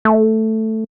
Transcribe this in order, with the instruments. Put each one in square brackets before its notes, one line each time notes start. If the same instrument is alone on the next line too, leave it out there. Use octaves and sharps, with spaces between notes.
[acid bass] A3